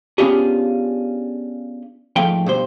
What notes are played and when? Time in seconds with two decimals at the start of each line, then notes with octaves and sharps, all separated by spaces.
0.18 B3 C#4 D4 F4 G4 G#4
2.16 G#2 F3 A3 F5 G5
2.46 G2 B2 C5